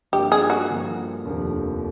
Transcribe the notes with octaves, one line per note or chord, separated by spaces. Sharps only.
G2 D3 F3 A#3 G4
G#4
F#4
G2 D3 F3 A#3
F1 D#2 D3 F3 A#3